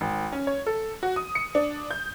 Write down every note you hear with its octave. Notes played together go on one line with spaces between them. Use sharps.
G#1
C#4
C#5
A4
F#4
D#6
C#7
D4
G6